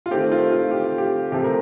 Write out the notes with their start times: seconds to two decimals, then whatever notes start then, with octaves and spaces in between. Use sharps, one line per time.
0.06 F4
0.11 D#3 A3 C4 G4
0.31 F4
0.52 F4
0.71 G4
0.84 F4
0.98 G4
1.31 C3 F3 A3 G4
1.44 A#4